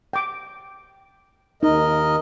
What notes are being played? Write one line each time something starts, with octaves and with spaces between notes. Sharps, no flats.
G5 D6
D#2 D#4 A#4 D#5